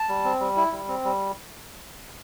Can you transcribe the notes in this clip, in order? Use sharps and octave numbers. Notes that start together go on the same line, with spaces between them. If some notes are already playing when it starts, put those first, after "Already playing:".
Already playing: A5
G3
C4
G3
E4
G3
C4
G3